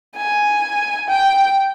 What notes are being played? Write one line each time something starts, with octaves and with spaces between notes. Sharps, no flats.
G#5
G5